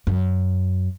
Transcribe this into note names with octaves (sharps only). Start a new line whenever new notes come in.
F#2